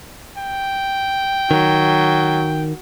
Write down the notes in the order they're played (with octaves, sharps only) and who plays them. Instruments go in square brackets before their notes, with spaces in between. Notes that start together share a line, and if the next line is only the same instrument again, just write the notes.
[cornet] G5
[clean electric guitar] D#3 [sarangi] F#3